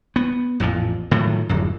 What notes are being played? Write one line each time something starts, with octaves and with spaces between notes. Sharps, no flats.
B3
A1 F2 A#2 F3
A2 D#3 F3 F#3
D1 G1 F#2